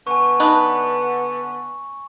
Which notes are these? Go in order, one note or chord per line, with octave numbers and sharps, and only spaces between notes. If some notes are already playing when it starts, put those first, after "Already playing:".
D3 B3 G#5 C#6
D4 D#4 B4